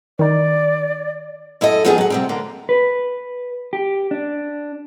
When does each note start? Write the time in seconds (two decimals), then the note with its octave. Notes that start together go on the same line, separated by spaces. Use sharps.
0.19 D#3 D#4 D5
1.61 F#2 E4 A4 D#5
1.85 F3 F#3 B3 F4 G4 G#4
1.98 F#3 F#5
2.10 C3 G3 C4
2.29 D3 A#3 D4
2.69 B4
3.73 G4
4.11 D4